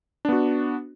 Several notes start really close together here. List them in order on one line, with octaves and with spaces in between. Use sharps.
D4 B3 F#4